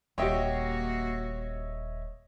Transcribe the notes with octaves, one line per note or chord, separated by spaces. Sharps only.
D#1 A#3 F#4 G4 C#5 D#5 E5 G5